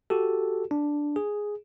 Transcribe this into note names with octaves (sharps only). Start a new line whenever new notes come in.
F#4 G4 A4
D4
G#4